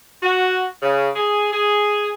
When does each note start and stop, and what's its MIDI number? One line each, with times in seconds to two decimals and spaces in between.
0.22 0.64 66
0.82 1.08 49
1.16 1.48 68
1.52 2.11 68